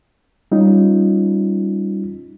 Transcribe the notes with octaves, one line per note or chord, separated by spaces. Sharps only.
G3 C#4 D#4 F4